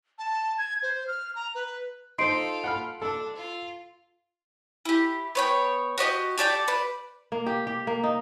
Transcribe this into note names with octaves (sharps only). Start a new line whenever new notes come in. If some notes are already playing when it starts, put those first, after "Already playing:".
A5
G#6
C5
F6
A#5
B4
D#4 F4 A4 C5 C6 C7 D7
F#5 B5 F6
D4 A4
F4
E4 G4
B3 C#5 G5
F#4 G4 D5 D#5
G4 A4 D5 G5
B4 D5
A#3
G4
G4
A#3
D#4